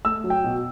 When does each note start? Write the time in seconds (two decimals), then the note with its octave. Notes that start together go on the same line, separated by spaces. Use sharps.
0.05 A3 E6
0.24 F#3
0.30 G5
0.44 B2